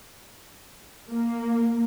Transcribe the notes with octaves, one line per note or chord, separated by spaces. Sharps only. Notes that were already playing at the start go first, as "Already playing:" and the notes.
A#3